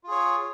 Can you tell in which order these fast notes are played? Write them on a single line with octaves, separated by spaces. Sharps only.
F4 G#4 C#5